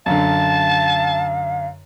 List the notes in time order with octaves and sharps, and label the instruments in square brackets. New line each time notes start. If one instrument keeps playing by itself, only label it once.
[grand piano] F#2 D3 [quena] F5 [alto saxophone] A5